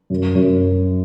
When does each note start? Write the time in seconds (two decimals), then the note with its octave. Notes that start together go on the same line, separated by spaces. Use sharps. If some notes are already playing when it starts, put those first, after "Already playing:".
0.10 F#2
0.35 F#2